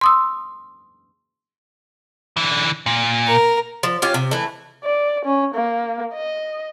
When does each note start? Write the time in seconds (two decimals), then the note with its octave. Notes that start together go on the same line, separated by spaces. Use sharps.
0.01 C6 D#6 E6
2.37 D3 E3
2.86 A#2
3.27 A#4
3.83 F3
4.02 C#4 F4 G4 F5
4.14 C3
4.31 E3 A3
4.84 D5
5.25 C#4
5.55 A#3
6.14 D#5